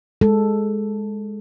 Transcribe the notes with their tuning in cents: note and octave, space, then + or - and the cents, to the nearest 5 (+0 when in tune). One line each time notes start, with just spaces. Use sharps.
G#3 +0 A4 +0